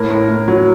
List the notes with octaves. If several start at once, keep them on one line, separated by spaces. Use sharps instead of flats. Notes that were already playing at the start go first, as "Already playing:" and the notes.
Already playing: A2 A#4
A2
A2
F#3